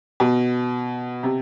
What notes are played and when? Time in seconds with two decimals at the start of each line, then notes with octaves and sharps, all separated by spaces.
0.20 B2
1.23 C3